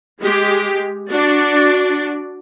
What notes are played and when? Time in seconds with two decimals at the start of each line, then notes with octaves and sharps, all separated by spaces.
0.22 G#3 G4
1.10 D4 F#4 D5